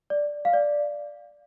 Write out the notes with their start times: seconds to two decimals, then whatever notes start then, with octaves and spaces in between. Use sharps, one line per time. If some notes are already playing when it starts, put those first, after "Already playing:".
0.10 D5
0.45 F5
0.53 D5